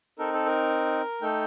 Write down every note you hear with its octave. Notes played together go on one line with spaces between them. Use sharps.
C4 D#4 A4 A#4
A4
A#4
A3 D#4 A4 G5